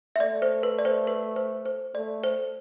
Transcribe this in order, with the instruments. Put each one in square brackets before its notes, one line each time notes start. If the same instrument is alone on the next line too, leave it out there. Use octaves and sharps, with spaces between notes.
[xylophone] E5
[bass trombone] A3 [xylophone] D5
[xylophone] C5
B4
D5
C5
B4
C5
C5
[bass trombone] A3 [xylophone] D5
[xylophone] C5